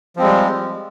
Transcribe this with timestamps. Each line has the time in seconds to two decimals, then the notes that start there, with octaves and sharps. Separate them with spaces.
0.16 F3
0.19 C4
0.21 G#3
0.24 G3